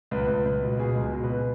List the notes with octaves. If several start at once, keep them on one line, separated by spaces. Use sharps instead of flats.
C#2 B4
C#2
C#2
B2
B2 G#4
C#2
B2
B4
B2